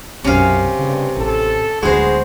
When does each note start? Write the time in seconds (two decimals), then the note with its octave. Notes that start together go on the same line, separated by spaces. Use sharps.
0.24 B1 F#2 C3 C#4 F5
0.79 G2 C#3
1.17 A1 A4
1.82 D1 D2 G#3 B3 F#4 C5